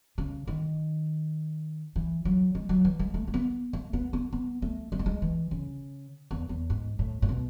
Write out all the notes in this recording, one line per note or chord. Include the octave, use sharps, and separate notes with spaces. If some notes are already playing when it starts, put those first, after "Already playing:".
C#3
D#3
E3
F#3
G#3
F#3
E3
G#3
A3
A3
B3
A3
B3
B3
B3
A3
G#3
A3
G#3
E3
C#3
E2
E2
G#2
A2
A2
B2